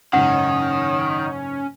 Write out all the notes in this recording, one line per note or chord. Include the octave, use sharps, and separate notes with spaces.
F#1 G#2 D#3 C#4 F#5